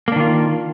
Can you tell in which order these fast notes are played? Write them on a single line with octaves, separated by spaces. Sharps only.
A#3 D4 D#3 F4